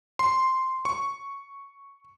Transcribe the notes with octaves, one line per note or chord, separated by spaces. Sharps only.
C6
C#6